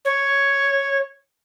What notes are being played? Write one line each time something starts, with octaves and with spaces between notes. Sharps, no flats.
C#5